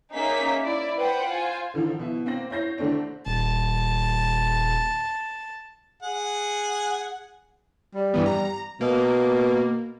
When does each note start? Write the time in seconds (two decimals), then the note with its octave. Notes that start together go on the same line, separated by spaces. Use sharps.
0.13 A#3 C#4 D#4 G#4 E5 B6
0.64 E4 D5
0.97 B4 C5 F#5 G5
1.26 F4 C5 G#5
1.74 A2 D3 D#3 F3
1.99 B2 E4
2.26 A#3 C4 C5 A#6 F#7
2.50 E4 C#5 G6 A#6 C7
2.78 C2 D3 A3 C4 D4
3.26 D#1 A5
6.03 G#4 F#5
7.95 G3
8.14 G2 E3 B3
8.26 A#5
8.81 B2 A#3